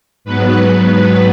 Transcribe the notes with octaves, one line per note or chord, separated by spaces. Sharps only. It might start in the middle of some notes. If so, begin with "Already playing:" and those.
G#2 F#3 B3 B4